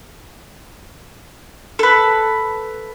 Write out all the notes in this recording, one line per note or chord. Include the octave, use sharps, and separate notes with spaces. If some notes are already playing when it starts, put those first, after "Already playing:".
A4 B4